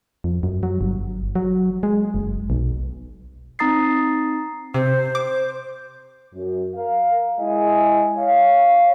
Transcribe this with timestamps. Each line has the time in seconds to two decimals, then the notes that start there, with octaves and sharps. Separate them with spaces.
0.24 F2
0.43 F#2
0.63 F#3
0.81 G1
1.35 F#3
1.83 G#3
2.14 F#1
2.50 B1
3.59 C4 D#4 A#5 D#6 A6 C7
4.74 C3 C5
5.15 D6
6.35 F#2
6.75 A#4 F5
7.40 G#3 E4 D#5 G#5
8.17 C#5 F5